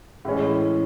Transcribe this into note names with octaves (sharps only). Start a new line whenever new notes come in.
A2 E3 G#3 C#4